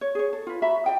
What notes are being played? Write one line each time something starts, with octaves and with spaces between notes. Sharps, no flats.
C#5
G#4 C#5
A4
F4 B4
F#4 E5 A#5 B5
D5 D#5 G5